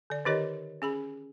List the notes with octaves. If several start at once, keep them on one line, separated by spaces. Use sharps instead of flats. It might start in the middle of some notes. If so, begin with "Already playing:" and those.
D3 D5
D#3 D#4 G4 A#4 C#5 D#5
C#4 G#4 B5